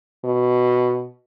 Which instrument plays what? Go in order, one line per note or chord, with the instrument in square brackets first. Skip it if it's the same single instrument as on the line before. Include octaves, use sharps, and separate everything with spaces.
[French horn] B2